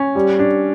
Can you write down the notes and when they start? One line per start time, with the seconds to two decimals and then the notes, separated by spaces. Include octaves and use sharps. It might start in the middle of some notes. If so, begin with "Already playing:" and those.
Already playing: C#4
0.15 G3
0.39 D4